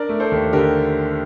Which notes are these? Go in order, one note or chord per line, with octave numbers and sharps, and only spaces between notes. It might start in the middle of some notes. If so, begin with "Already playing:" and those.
Already playing: D4 A#4 D5
A3
A4 C5
D#2
D3 G4 A#4